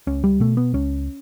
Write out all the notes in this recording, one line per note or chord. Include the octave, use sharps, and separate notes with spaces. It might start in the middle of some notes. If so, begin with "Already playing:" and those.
C#2 C#4
G3
B2 A3
B3
C#2 C#4